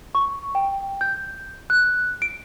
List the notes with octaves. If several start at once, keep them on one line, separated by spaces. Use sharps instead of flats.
C#6
G5
G6
F#6
D7